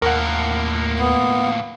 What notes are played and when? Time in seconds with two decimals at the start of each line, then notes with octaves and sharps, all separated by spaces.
0.02 D#2 A2 A#3 A#4 F#5
0.99 B3